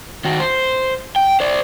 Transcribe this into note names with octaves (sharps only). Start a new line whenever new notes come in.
D#3 F#4
C5
G5
C5 D5